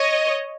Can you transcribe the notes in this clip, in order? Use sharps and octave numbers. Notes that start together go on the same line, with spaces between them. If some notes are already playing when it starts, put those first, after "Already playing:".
Already playing: C#5 D#5